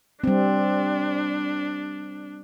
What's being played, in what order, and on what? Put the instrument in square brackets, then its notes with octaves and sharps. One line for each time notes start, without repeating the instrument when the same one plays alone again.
[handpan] G3 C4 [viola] D4